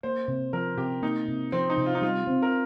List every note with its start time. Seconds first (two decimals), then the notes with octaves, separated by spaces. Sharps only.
0.03 A#3 C5
0.28 C3
0.53 F3 A#4
0.78 C3 G4
1.02 A#3 D#4
1.28 C3
1.52 F3 C4
1.70 D#4
1.77 C3
1.86 F4
1.95 D#4
2.02 G3 F4
2.27 C4
2.43 A#4